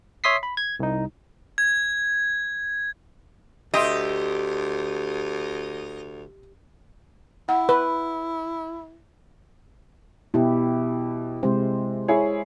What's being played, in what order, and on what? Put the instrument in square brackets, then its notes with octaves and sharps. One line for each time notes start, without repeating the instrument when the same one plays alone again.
[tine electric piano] C#5 E5 C6 D#6 B6 C7
B5
G#6
C2 D#4
[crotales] G#6
[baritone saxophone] D2 [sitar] G4 [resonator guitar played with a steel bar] D#5 [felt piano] E5 C6 D#6
[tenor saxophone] E4 [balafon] F#5
[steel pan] B4
[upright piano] B2 [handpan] E4 G4
[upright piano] C3 [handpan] G#3 C5
[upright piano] E4 G#4 C#5